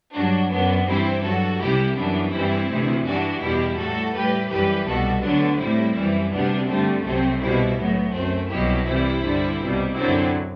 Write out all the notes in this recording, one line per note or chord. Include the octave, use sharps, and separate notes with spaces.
G2 F#3 D4 F#4
F#2 F#3 B3 D4
G2 E3 G3 C4 E4
G2 F#3 F#4 A4
C2 C3 G3 E4 G4
F#2 E3 G3 B3 D4
G2 E3 G3 C4 E4
D2 C3 E3
G2 E3 G3 D4 F#4
E2 B2 G3 E4 G4
A2 G3 F#4 A4
A2 G3 G4 B4
F#2 E3 G3 G4 B4
C2 B2 G3 F#4 A4
D2 D3 F#3 B3 D4
A2 G3 C4 E4
F#2 E3 G3
D2 C3 G3 B3 D4
G2 D3 G3 A3 C4
C2 C3 F#3 A3 C4
C2 B2 G3 C4 E4
A2 F#3 B3
F#2 F#3 A3 C4
C2 B2 F#3 E4 G4
C2 C3 E3 G3 C4 E4
G2 D3 G3
C2 B2 G3
F#2 D3 F#3 C4 E4